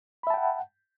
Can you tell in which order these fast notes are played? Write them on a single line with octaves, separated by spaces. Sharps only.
B5 E5 A5 G5 F#5